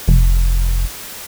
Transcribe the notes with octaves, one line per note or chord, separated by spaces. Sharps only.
F1